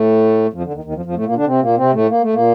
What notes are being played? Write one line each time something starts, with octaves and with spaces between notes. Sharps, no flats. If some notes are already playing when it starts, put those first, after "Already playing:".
Already playing: A2 A3
F2 F3
D3
D#2 D#3
D#2 D#3
F2 F3
F2 F3
A2 A3
A#2 A#3
D3 D4
C3 C4
A#2 A#3
C3 C4
A2 A3
A#3
A3
A#2 A#3